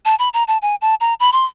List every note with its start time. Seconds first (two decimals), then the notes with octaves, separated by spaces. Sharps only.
0.05 A5
0.19 B5
0.34 A#5
0.48 A5
0.62 G#5
0.81 A5
1.01 A#5
1.20 B5
1.32 C6